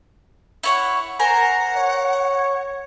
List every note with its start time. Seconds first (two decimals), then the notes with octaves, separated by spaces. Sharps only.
0.63 E4 C#5 F#5
1.20 A#4 C5 F#5 G#5 A#5
1.76 C#5